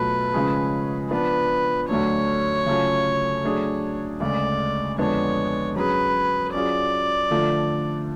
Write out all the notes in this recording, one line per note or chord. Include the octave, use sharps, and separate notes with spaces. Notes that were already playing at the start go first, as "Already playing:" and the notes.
Already playing: B2 F#3 A3 F4 A4 B4
C#3 F3 G#3 C#4 G#4
F3 B3 D4 B4
D2 D3 F#3 A3 D4 C#5
C#3 F#3 A3 C#4 F4
F#3 A3 D4 G#4
D2 C#3 G#3 D5
F2 D3 G#3 B3 D4 C#5
F#3 C#4 G#4 B4
F#3 C#4 F4 G#4 D5
D3 F3 A3 D4 F4